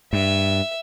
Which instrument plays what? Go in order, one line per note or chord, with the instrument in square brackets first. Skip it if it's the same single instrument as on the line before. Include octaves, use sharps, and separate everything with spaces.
[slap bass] G2 [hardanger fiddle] E5